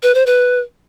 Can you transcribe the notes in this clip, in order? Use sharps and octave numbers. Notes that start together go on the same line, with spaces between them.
B4
C5
B4